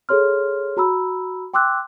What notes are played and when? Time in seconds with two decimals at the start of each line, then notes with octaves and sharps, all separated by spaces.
0.09 G#4 A4 C#5 C6 F6
0.77 F#4 A#5 B5 E6
1.54 G5 C6 D6 E6 F#6